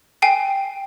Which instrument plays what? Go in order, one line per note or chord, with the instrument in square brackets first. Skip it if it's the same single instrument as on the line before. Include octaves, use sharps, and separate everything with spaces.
[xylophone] G5 G#5 C7